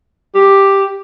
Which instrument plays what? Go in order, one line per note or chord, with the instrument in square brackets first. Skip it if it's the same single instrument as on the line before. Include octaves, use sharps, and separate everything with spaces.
[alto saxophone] G4